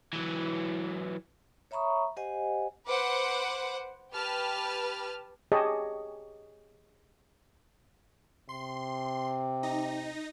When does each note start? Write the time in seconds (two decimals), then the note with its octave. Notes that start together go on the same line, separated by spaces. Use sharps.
0.13 E3 F#3
1.71 C#5 E5 A#5 B5 C#6 D#6
2.17 G4 C5 D#5 F#5 G#5
2.88 B4 C5 F#5 D6
4.13 G4 B4 A5 F6
5.52 G4 G#4 C#5 D#5 A5
8.49 C3 C6
9.63 D#4 A#6